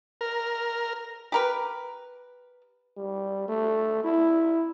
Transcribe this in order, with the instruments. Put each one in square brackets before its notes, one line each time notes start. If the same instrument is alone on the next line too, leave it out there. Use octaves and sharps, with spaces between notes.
[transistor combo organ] A#4
[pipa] G4 A#4 B4
[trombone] G3
A3
E4